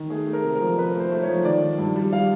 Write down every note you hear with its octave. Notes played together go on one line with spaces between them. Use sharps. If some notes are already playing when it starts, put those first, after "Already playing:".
Already playing: D#3
A3 G#4
A3
A#4
C3
A#4
F3
F3 B4
A3 C5
A3
C#5
F3
D#3 D5
D#3
G2
G3
G3 F5